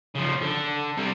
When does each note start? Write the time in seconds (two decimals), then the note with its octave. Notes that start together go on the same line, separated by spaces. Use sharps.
0.15 C#3 F3
0.42 D3
0.97 C3 G3